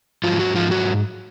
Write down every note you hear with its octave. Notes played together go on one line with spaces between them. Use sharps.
G#2 F3 F#3 F4
F#3 F#4
F3 F4
F#3 F#4